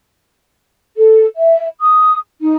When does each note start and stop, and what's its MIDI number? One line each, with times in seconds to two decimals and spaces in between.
0.97 1.25 69
1.36 1.65 76
1.79 2.17 87
2.40 2.56 63